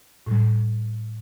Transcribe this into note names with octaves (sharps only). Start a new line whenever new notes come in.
A2 G3